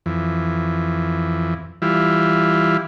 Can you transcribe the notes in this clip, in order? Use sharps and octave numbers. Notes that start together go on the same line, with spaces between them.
F2 E3
E3 G3 E4 F4